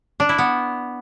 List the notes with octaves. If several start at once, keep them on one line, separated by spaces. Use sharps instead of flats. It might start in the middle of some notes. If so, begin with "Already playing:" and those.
D4
E4
B3